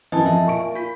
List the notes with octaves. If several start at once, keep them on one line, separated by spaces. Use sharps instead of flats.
F#2 E3 D#5 G#5 A5
F2 F3 E5
A#2 C#6 D7
F4 B6